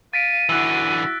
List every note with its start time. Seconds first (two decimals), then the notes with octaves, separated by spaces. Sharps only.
0.13 F5 A6 B6 D7 D#7
0.49 D3 E3 E4 F#4 E6 F#6